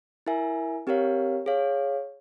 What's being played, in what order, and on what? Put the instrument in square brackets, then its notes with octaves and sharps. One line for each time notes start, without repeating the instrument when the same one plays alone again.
[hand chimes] E4 A#4 E5 G#5
C4 G4 A#4 C#5 F5
G#4 C#5 F5